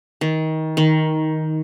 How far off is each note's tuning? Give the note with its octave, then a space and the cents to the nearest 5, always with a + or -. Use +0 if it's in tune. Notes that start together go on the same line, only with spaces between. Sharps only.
D#3 +25
D#3 +10